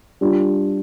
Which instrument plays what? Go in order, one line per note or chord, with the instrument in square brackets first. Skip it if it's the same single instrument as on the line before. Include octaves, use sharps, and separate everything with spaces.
[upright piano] G3 D4 F4